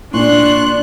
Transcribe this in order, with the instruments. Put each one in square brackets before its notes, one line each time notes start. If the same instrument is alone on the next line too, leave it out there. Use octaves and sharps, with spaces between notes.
[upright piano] A#2 [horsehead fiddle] D4 [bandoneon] C6 C#6 [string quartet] F#6